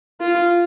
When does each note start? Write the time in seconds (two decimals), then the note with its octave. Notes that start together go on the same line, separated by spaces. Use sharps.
0.21 F4